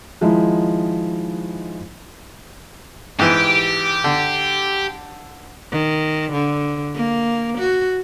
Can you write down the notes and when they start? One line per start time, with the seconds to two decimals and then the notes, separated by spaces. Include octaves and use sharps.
0.21 D#3 F3 G#3 D#4 E4
3.19 G#2 E3 G4
4.04 D3
5.72 D#3
6.33 D3
6.95 A#3
7.58 F#4